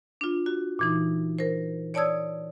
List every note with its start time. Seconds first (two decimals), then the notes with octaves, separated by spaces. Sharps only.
0.21 D4 F4
0.46 F#4
0.79 A#2 E3 D#4
1.39 A#4 C5
1.94 C#5 D5 A5 D#6 E6 G#6